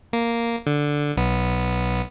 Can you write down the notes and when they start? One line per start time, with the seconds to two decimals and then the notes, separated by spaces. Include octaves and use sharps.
0.13 A#3
0.67 D3
1.16 B1 B3